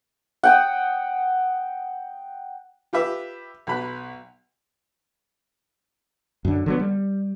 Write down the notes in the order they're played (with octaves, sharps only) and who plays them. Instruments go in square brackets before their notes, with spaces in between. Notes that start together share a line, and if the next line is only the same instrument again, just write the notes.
[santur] F#5 G5 D#6
[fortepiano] F4 G4 B4 E5
B1 B5 F#6
[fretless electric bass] F#2 D3
D3 F#3 B3
G3